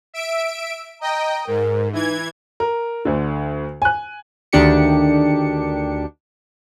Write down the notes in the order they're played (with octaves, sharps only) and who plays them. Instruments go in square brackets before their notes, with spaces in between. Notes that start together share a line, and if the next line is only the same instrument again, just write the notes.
[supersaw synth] E5 D7
[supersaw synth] D#5 G5 [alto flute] A#5
[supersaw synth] G#2 [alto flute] A#4
[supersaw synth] E3 G#6 [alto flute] D#4
[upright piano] A#4
D2 D3
G#5 F#6
[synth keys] D2 D#3 D4 G4 C#7